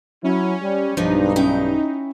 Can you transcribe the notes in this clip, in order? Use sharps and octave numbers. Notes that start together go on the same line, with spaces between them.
F#3 C#4 E4
G3
B1 G2 F3 D4 D#4
C#4 E4 G5